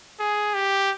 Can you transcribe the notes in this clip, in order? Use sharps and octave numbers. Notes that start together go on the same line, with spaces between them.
G#4
G4